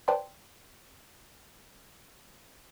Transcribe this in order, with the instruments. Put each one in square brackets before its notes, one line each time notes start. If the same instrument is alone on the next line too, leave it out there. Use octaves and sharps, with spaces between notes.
[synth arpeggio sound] B4 C5 D5 G5 A5 C6